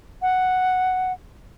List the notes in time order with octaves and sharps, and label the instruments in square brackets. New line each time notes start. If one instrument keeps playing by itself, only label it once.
[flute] F#5